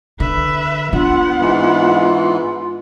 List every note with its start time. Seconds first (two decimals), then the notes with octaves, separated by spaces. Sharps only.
0.20 D3 B4 E5
0.93 B3 D4 F4 F#5
1.40 G#2 E3